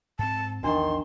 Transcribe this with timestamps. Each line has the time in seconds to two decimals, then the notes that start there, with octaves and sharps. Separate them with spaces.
0.19 G#2 C4 A5
0.64 A#1 E2 D#3 D4 C6